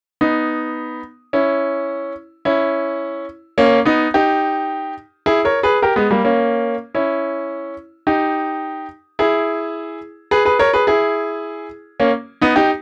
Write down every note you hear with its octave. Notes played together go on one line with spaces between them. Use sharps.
B3 D#4
C#4 E4
C#4 E4
A#3 C#4
B3 D#4
D#4 G4
E4 G#4
A#4 C#5
G#4 B4
G4 A#4
G#3 B3
G3 A#3
A#3 C#4
C#4 E4
D#4 G4
E4 G#4
G#4 B4
G#4 B4
A#4 C#5
G#4 B4
E4 G#4
A#3 C#4
B3 D#4
D#4 G4